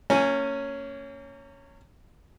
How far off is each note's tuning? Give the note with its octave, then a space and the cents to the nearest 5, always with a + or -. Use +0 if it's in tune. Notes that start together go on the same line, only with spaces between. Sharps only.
A#3 -35 C#4 +0 G#5 +0